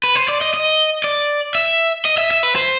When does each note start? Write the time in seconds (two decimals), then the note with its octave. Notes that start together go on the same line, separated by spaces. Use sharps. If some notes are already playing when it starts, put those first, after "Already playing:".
0.04 B4
0.15 C5
0.28 D5
0.41 D#5
0.54 D#5
1.04 D5
1.55 E5
2.05 D#5
2.18 E5
2.31 E5
2.43 B4
2.56 C5